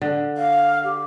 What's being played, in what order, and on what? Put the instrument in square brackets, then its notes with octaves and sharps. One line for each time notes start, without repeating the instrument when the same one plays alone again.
[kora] D3
[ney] F5
G4